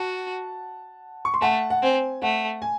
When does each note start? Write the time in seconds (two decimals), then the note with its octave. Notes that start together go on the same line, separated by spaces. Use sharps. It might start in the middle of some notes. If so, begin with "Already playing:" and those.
Already playing: F#4 F#5 A5
1.25 C#6
1.34 C6
1.42 A3 F#5 A5
1.70 F#5
1.82 C4 G#5
2.22 A3 F#5
2.62 G#5